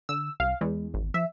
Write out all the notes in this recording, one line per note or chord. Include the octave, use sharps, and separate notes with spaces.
D3 E6
C2 F5
E2 G#3
G#1
F3 E5